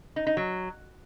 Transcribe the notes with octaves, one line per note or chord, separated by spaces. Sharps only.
D#4
D#4
F#3